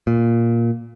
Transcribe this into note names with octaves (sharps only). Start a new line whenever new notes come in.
A#2